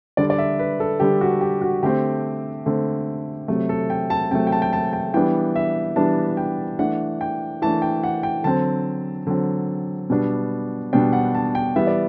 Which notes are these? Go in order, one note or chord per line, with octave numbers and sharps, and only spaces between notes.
D3 G3 D4 D5
D5
E5
B4
A4
D3 G3 D4 G4
F#4
G4
F#4
D3 A3 C4 G4
D3 A3 C4
C3 F#3 A3
A4
G5
A5
C3 F#3 A3 G5
G5
A5
G5
A5
G5
E3 G3 B3 D4 G5
E5
E3 G3 B3 D4 A5
G5
E3 A3 D4 F#5
G5
E3 A3 D4 A5
G5
F#5
G5
D3 F#3 C4 A5
D3 F#3 C4
B2 G3 B3 D4
B2 G3 B3 D4 G5
F#5
A5
G5
E3 G3 B3 E5
D5